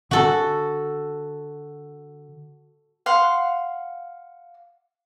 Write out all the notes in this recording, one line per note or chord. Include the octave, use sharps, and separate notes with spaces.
D3 F#4 A4
F5 F#5 C6